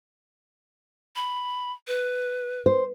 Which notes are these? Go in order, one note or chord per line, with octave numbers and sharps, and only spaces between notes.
B5
B4
C5